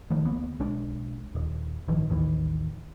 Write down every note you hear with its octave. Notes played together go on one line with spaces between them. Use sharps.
D#3 F3 A3
D2 A#3 B3
B1 G#3 D4
D#1
A1 G2 D#3 F3
A1 D#2 D#3 E3